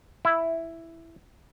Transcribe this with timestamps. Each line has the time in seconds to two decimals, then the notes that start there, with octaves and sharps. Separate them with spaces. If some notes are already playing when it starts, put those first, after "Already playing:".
0.25 E4